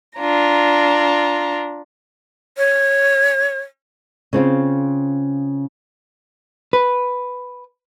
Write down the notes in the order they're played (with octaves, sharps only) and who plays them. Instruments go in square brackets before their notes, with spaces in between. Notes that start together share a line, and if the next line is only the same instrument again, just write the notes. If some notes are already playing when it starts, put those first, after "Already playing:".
[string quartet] D4 F4 A#5
[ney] C#5
[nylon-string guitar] C#3 C4 F4 C5
[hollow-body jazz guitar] B4